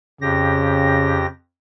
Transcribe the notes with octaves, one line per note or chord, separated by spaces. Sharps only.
F2 C#3 G4 A#6